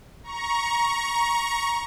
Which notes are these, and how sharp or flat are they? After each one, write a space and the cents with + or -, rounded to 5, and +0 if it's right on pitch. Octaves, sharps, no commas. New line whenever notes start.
A#5 +20 C#6 +0